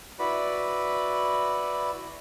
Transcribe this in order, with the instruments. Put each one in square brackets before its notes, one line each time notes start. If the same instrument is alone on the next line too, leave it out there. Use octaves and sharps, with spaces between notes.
[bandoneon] E4 F#4 B4 D5 B5